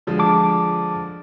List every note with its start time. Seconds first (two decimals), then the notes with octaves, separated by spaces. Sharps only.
0.07 D3 F3 G#3
0.19 A5 D6